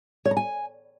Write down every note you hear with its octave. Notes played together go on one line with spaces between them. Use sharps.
C#5
A#5
G#5